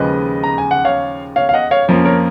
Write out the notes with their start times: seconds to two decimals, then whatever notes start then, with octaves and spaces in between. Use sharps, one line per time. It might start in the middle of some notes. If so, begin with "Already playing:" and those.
Already playing: D#2 C#3 F3 G#3 B4 D#5
0.44 A#5
0.58 G#5
0.71 F#5
0.85 C#5 F5
1.36 C#5 F5
1.49 F5
1.54 D#5 F#5
1.71 C#5 F5
1.88 F2 F3 A#3 C#4
2.05 A#4 C#5